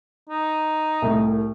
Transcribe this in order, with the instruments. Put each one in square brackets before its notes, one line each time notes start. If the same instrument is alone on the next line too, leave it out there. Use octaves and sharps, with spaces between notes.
[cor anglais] D#4
[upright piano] C2 A2